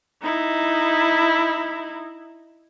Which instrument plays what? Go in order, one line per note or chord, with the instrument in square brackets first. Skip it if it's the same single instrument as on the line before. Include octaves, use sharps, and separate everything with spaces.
[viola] D#4 E4